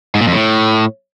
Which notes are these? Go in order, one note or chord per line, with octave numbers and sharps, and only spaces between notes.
G#2
A#2
F2
A2